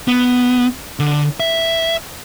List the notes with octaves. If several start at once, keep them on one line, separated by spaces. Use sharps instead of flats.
B3
D3
E5